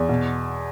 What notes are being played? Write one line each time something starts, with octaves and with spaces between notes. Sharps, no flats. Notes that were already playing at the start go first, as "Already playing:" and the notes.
Already playing: E2
B2